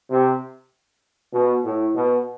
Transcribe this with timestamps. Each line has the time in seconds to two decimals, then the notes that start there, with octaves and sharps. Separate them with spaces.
0.10 C3
1.34 B2
1.65 A2
1.95 B2